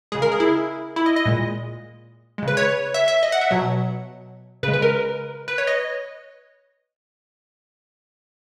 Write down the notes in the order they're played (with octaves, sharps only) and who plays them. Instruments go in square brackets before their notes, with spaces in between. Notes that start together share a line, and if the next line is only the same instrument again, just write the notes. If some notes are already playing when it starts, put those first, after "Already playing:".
[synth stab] C#3 G#3 G#4
A#4
G#4
E4
E4
D#5
D#5
A#2 G#3
C#3 G#3
B4
C#5
E5
E5
D#5
F#5
E5
B2 F#3
C#3 B4
G#3
B4
A#4
B4
C#5
D#5